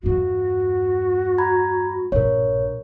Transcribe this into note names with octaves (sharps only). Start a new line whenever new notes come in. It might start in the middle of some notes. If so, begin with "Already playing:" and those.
E2 G2 F#4
A#5 B5 G#6
A#1 G2 A#4 C#5